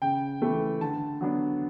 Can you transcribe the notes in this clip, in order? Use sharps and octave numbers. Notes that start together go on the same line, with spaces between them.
C#3 G5
E3 A3
D3 A5
F#3 B3 D4